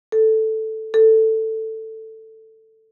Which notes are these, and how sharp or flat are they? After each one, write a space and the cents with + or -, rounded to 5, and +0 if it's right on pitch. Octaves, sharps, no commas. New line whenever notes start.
A4 +0
A4 +10